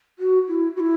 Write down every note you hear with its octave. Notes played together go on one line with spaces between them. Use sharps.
F#4
E4
F#4
E4